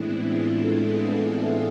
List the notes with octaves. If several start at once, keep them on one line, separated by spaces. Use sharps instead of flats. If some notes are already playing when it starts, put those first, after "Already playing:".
Already playing: A2 E3 G#3 B3 C4 D4 E4
D4 F4
F4 A4
E4 G#4
E4 G#4